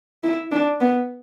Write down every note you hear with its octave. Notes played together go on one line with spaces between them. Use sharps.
E4
D4
B3